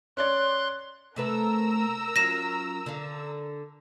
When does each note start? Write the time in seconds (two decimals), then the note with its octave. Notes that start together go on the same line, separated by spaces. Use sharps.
0.17 C#4 C#5 D5 C6 F#6
1.16 C3 A3 A#4 B4 A#5 E6
2.16 F#3 C#4 F4 A#6 E7
2.86 D3 F5